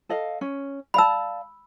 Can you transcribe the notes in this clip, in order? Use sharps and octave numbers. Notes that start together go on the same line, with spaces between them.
A4 D#5 F5
C#4
D5 F5 A5 B5 E6